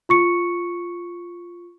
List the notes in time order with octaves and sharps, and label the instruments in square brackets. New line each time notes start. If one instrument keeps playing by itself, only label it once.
[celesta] F4 C#6 C#7